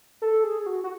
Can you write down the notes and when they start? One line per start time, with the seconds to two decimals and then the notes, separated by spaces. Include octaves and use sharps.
0.22 A4
0.44 G#4
0.66 F#4
0.84 F#4